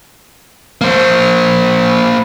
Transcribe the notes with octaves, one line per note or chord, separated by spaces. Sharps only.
A#3 C5